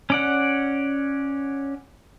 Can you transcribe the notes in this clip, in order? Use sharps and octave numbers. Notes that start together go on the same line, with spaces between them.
C#4 D5 F#5